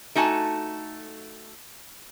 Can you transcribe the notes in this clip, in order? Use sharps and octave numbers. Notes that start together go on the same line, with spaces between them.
A3 D#4 F#4 G#5 A5